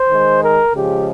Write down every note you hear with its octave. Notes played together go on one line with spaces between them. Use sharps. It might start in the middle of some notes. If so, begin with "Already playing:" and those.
Already playing: C5
D#3 G#3
A#4
C#3 F3 G#3 G4